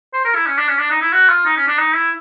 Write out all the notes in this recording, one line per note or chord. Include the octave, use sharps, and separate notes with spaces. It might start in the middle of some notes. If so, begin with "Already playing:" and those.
C5
A#4
E4
C#4
D4
C#4
D4
D#4
E4
F#4
F4
D#4
C#4
D4
D#4
E4